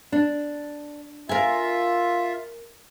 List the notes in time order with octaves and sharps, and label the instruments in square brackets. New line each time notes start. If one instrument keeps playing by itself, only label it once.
[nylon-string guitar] D4
[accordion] F4 E5 [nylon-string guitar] A#4 G#5